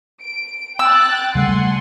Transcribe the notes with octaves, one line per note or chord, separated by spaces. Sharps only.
D7
G5 E6 F#6 A6
C#3 G3 A3 F#5 G#5 C6